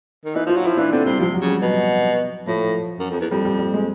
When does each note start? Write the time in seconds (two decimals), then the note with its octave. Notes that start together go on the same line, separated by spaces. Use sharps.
0.25 D#3
0.35 E3 D#4
0.46 F3
0.49 F4
0.56 F#3
0.64 E4
0.67 F3
0.77 E3 D4
0.92 D3 C4
1.06 C3 G3
1.20 C3 F3
1.34 F#3
1.41 C#3
1.48 G3
1.62 B2 F#3
2.47 A2 F3
3.00 F#2
3.11 F2
3.20 E2
3.31 F2 G3
3.45 G3
3.59 G3
3.74 G#3